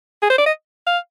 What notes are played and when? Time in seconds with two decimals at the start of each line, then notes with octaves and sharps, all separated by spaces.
0.22 G#4
0.30 C5
0.38 D5
0.46 D#5
0.87 F5